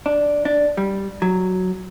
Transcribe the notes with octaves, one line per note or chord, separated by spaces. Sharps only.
D4
D4
G3
F#3